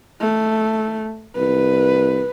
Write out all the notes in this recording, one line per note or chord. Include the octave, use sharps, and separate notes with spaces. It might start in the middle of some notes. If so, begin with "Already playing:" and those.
A3
C2 B4